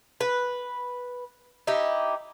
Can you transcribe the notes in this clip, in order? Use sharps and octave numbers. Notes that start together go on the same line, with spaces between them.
B4
D#4 E4 G4